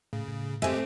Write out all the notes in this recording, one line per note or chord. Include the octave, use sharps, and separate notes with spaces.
A2 C#3
A2
G#3 A3 C4 G4 E5 G#5